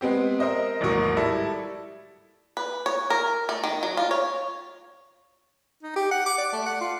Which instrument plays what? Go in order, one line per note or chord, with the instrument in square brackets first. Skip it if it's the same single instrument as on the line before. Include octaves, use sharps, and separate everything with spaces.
[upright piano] G#3 B3 C4 G4
A#4 C5 D#5 E5
A1 D#2 G#2 F#3 A#4 C#6
G3 E4 A4
[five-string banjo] B4
C#5
A#4
A3
D#3
F#3
F4
C#5
[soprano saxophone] D#4
G4
F#5
D6
D5
A3
F#5
F4